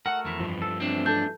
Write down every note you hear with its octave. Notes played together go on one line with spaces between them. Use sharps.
A3 F#4 A#4 F#5
F2 E3
G2 F3
A4
E3 A3 C4 D4
D4 A4 A5 G6